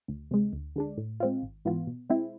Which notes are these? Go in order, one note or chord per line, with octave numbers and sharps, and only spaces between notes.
D2
C3 G#3
D2
D3 G#3 D4
A2
G#3 C4 F4
G#1
G#2 E3 B3 F4
B2
G#3 C4 E4